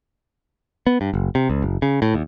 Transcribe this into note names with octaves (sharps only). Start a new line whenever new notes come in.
B3
G2
F#1
C3
C#2
F#1
C#3
A2
D#2